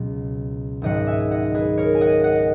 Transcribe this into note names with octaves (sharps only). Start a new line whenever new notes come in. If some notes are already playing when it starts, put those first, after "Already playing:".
Already playing: C#2 B2 F#3
G#1 G#2 F#3 D#5 F#5
E5 G#5
D#5 F#5
G#4 B4
A#4 C#5
G#5
D#5 F#5
D#5 F#5